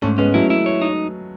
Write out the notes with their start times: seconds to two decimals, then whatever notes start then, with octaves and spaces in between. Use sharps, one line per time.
0.02 G#2 A3 C#4
0.18 G#3 B3 C#4
0.34 F#3 A3 E4
0.50 E4
0.66 C#5
0.82 D#4